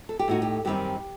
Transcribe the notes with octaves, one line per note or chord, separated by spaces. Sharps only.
A4
G4
A2 A3 D#4 F#4
G4
F#2 D#3 G3 C4 D#4 G4